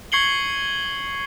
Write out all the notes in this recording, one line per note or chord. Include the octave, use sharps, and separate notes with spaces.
C#6 G#6 C7 C#7 F#7 G7